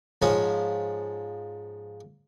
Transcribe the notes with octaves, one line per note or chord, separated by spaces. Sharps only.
G#2 F3 C#4 G#5